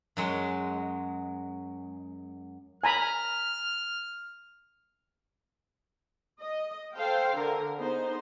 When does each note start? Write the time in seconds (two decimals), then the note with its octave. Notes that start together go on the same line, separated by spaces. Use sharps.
0.17 F#2 F#3 G#3
2.84 G#5 A#5 B5 F6
6.40 D#5
6.95 A4 C5 F5 G5
7.33 D3 A#4
7.77 B3 D#4 G#4 C5